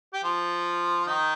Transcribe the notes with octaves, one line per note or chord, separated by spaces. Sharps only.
G4
F3 F4
D#3 D#4